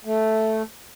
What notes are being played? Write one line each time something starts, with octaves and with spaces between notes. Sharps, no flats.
A3